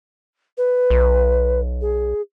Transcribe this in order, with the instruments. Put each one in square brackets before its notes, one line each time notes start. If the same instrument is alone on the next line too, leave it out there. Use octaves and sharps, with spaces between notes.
[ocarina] B4
[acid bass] B1
[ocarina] G#4